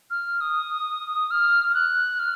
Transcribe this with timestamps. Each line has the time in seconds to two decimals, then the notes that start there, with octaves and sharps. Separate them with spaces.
0.11 F6
0.41 D#6
1.31 F6
1.70 F6
1.74 F#6
2.19 F6